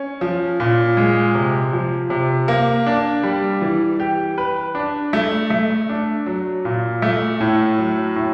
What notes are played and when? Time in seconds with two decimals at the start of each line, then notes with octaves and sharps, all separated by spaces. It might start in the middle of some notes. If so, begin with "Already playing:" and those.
Already playing: C#4
0.21 F3
0.60 A#2
0.97 G#3
1.35 C3
1.73 F3
2.10 C3
2.48 A#3
2.86 D4
3.23 G3
3.61 E3
4.00 G4
4.38 B4
4.75 D4
5.13 A3
5.50 A3
5.89 D4
6.26 F#3
6.65 A#2
7.02 A3
7.40 A2
7.77 F#3
8.16 A2